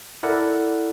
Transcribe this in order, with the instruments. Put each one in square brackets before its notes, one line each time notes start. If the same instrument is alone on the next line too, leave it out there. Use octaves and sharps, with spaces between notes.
[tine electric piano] E4 A4 A#4 D5 F#5